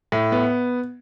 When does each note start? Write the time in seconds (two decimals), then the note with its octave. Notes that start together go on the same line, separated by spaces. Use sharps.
0.12 A2
0.32 B3